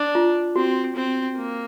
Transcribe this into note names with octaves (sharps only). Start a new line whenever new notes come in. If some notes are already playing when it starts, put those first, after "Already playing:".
Already playing: D4
F4
C4 F#4
C4
A#3